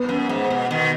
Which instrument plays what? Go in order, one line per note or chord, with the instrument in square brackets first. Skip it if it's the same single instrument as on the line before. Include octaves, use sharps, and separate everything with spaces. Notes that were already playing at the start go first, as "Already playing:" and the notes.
Already playing: [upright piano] B3
[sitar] F#2
G#2
B2
B2 D#3